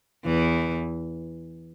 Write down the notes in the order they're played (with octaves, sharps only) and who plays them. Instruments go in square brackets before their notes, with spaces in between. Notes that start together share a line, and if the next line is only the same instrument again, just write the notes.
[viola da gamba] E2 E3